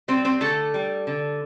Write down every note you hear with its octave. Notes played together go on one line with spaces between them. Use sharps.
G3 C4 C5
C4 C5
D3 A3 A4
G3
D3